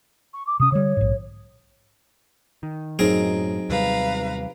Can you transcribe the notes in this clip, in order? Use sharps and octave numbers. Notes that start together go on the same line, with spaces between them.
C#6
D6
C3 C#4 D#6
D3 G3 C#5
A#1 G#2
D#3
F#2 A2 F#3 C4 D#4 G#4 A#4
D#2 C3 G3 B4 F5 A#5